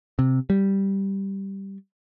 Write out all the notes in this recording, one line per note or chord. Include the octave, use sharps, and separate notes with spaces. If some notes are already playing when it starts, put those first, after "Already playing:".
C3
G3